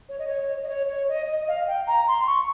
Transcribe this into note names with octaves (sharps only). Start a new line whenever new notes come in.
C#5
D#5
C#5
D#5
C#5
C#5
D#5
D#5
F5
G5
A#5
C6
C#6